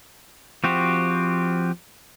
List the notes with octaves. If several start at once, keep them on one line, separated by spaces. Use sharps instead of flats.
F3 C4 F#4 G4